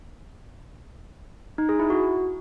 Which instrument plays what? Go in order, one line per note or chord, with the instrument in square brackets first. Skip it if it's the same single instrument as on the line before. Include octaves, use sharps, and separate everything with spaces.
[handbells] D#4
G#4
E4
F#4